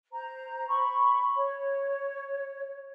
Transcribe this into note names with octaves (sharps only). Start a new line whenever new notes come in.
C5 A#5
B5 C#6
C#5